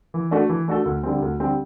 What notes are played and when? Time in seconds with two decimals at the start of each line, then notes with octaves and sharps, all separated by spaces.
0.14 E3
0.31 A3 D4 F#4 A4
0.49 E3
0.68 A3 D4 F#4 A4
0.85 D2
1.03 D3 G3 C4
1.22 D2
1.40 D3 G3 C4